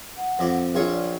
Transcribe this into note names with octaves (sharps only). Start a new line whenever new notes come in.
F#5
F2 D5
A#1 F4 G#4 C#5
D5